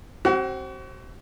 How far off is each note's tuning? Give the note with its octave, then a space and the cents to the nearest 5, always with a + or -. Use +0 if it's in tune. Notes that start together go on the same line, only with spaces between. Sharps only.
C4 +25 F#4 +40 F#5 +0